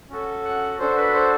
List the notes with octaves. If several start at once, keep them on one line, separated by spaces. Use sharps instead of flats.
C#4 F#4 A4
F#5
D4 F#4 A4 C5
B4
C5